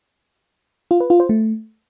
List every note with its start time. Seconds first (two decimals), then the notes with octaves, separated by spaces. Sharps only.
0.91 F4
1.00 B4
1.10 F4
1.20 C5
1.29 A3